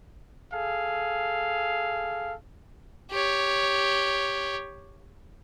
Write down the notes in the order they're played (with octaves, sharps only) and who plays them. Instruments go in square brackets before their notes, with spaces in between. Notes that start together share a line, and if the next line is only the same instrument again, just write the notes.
[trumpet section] G#4 A4 F5
[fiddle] G4 C#5